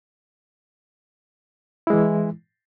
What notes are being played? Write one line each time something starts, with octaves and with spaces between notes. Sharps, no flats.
E3 G#3 E4